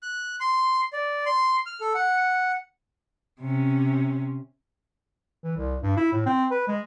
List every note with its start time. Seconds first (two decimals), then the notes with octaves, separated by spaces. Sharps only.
0.02 F#6
0.40 C6
0.93 D5
1.26 C6
1.66 F6
1.81 A4
1.94 F#5
3.41 C3 C#4
5.44 E3
5.57 C2
5.83 G2
5.97 E4
6.12 A2
6.26 C4
6.51 B4
6.68 G#3